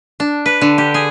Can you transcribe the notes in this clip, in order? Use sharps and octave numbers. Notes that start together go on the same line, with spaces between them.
D4
B4
D3
G4
G#4